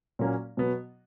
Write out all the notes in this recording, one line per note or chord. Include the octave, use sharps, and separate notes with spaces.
A#2 F#3 A#3 C#4
B2 F#3 B3